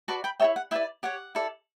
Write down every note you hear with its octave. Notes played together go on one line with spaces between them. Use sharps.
F#4 B4 D5 A5 C#6
G5 B5
E4 A4 C#5 E5 G5
F#5
E4 B4 D5 E5 G5
G4 C#5 F#5
E4 A4 D5